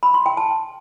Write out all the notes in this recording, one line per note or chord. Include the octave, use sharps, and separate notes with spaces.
B5
C6
G5
A5